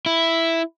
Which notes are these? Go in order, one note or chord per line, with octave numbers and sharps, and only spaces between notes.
E4